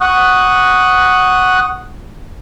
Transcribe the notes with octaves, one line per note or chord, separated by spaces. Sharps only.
F#5 C#6 D#6 F#6